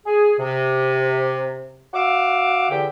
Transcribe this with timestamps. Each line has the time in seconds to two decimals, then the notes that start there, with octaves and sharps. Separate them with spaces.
0.06 G#4
0.39 C3
1.94 F#4 E5 F5 D6
2.70 E2 D3 G4 G5